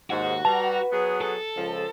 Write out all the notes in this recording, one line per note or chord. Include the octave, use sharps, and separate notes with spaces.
D#2 G#2 F#4
G3 B4 A5 A#5
F#3 B3 G#4
A4
C#2 F3